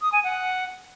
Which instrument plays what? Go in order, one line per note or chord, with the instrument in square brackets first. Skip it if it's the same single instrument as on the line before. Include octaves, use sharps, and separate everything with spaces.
[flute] D#6
G#5
F#5